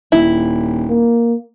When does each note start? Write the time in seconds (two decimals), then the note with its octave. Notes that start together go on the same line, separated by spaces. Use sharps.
0.12 D#1 E4
0.89 A#3